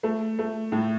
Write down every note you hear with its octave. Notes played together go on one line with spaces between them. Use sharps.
A3
A3
A2